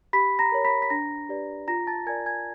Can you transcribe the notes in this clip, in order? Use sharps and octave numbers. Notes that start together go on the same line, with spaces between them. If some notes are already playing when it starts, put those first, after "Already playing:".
G4 B5 B6
A#5 A#6
A#4 C#5
B5 B6
B6
D4 A#5 A#6
G4 B4 D5
F4 A#5 A#6
A5 A6
A#4 D5 G#5 G#6
G#5 G#6